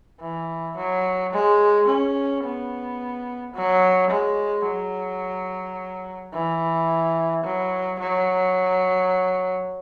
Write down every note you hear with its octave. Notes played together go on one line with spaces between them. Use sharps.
E3
F#3
G#3
C#4
B3
F#3
G#3
F#3
E3
F#3
F#3